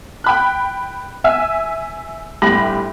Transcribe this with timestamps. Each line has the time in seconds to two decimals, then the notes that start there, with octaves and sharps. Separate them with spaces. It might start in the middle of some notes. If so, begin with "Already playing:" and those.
0.24 G5 B5 F#6
1.24 E5 G#5 E6
2.42 G1 A2 G4 B5 A#6 F#7